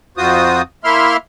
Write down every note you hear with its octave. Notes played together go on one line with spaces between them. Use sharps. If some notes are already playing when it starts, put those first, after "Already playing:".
F2 F4 F#4 C5 D#6
A#3 E4 E5 C6 F6